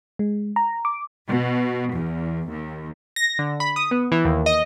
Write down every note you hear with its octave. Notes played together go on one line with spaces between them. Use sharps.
G#3
A#5
D6
B2
E2
D#2
A#6
D3
B5
D#6
B3
E3
D#2
D#5